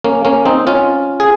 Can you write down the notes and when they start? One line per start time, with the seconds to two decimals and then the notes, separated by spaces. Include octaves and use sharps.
0.04 A#3 C#4
0.25 A#3 C#4
0.46 C4 D#4
0.67 C#4 F4
1.20 G#4